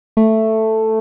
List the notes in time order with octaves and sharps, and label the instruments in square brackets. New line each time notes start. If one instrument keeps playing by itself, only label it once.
[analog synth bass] A3